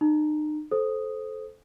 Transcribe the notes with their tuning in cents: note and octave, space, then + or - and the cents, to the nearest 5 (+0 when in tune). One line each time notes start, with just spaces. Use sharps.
D#4 -40 A#5 +0
A4 -15 C5 +0 D#6 +0